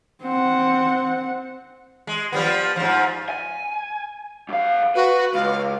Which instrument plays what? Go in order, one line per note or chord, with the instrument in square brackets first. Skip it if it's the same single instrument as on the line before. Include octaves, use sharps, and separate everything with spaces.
[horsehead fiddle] C4 F#5
[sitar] G#3
F3 G3 B3
G#2 F3
[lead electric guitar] G#5
F#2 F5
[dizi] F#4 [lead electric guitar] B4
[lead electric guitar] C#2 [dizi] F5